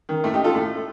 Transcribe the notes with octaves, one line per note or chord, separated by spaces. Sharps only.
D#3
A2 A3
D#4 G4
F4 A4
A2